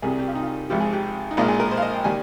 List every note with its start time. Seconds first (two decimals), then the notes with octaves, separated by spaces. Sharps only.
0.02 C2 C3 G3 G#4
0.19 G4
0.28 F4
0.35 D#4
0.43 F4
0.70 G#1 G#2 F3 G4
0.81 G#4
0.93 G4
1.31 D#4
1.37 A#1 A#2 G#3 F4
1.48 G#4
1.60 A#4
1.71 C5
1.77 F5
1.82 D#5
1.93 G5
2.04 D#3 G3 A#3 G#5